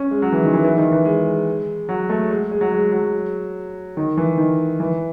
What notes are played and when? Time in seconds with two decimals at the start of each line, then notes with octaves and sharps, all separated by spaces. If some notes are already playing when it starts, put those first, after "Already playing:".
Already playing: C#4
0.11 G#3
0.22 F#3
0.32 E3
0.43 D#3
0.53 E3
0.64 E3
0.77 D#3
0.92 E3
1.05 G#3
1.89 F#3
2.09 A3
2.30 G#3
2.51 G#3
2.61 F#3
2.72 G#3
2.92 F#3
3.97 D#3
4.17 E3
4.38 D#3
4.80 E3